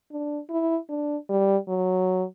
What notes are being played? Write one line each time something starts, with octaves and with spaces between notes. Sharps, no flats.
D4
E4
D4
G3
F#3